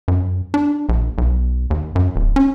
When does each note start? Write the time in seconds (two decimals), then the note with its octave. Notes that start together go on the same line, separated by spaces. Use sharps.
0.08 F#2
0.54 D4
0.89 A#1
1.18 B1
1.70 D#2
1.95 F#2
2.16 D1
2.36 C#4